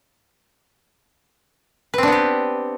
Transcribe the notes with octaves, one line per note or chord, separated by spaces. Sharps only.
B3 C4 D4 G4 B4